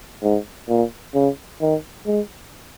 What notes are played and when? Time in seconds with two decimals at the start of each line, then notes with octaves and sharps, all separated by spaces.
0.23 G#2
0.69 A#2
1.14 C#3
1.61 D#3
2.06 G#3